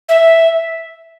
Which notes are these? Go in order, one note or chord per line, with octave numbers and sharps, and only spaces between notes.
E5